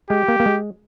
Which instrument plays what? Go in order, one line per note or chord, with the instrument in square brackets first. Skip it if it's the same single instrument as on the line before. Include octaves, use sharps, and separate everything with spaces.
[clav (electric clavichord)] G#3 [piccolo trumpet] G4
[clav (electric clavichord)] A#3
A#3
G#3